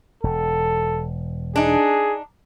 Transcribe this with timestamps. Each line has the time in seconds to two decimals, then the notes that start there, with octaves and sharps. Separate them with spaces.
0.24 E1 A4
1.56 D4 D#4 G#4